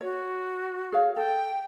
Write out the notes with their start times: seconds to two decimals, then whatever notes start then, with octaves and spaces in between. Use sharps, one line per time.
0.01 F#4 C#5
0.92 G#4 C#5 F5
1.16 A4 G5